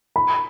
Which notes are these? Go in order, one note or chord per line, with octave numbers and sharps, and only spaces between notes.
B5